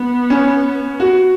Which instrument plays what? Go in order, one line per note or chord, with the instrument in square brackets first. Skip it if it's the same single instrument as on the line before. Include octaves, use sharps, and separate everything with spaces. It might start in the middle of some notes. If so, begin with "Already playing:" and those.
Already playing: [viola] B3
[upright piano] C#4
F#4